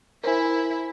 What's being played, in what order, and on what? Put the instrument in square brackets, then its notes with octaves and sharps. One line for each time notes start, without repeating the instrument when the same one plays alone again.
[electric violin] E4 E5 [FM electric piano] A#4 C5 G#5